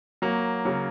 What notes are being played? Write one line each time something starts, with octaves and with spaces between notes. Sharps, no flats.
F#3 A#3
C#3 F#3